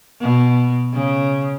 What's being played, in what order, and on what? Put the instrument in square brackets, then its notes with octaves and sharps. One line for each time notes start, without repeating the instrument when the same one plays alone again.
[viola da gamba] B2
C#3